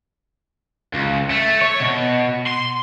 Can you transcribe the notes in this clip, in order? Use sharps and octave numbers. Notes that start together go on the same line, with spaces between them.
C#2
A3
C#5
B2
C6